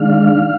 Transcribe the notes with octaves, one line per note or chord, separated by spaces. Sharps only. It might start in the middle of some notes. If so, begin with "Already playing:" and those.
Already playing: D#3 G#3 D4 F5